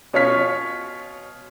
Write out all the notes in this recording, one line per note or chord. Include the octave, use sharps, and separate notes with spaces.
B2 C#4 F4 C#5 F6 B6